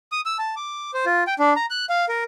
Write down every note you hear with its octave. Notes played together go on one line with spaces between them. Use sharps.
D#6
E6
A5
D6
C5
F4
G5
D4
A#5
F#6
F5
A#4